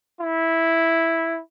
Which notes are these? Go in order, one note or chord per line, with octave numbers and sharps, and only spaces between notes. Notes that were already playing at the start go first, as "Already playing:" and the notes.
E4